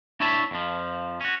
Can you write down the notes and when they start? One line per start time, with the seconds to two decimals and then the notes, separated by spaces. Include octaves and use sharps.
0.20 D4 E4 C#5 E5 A5 B5
0.51 F2 F3
1.21 C#4 F#4